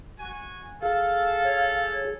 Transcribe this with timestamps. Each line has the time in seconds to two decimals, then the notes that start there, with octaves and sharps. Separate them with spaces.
0.19 F#4 G#5
0.83 G#4 A4 F5
1.44 C#5